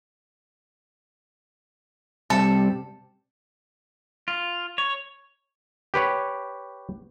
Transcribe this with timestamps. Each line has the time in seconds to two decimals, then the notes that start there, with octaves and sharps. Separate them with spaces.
2.30 C3 G3 A4
4.28 F4
4.78 C#5
5.94 G4 B4 C#5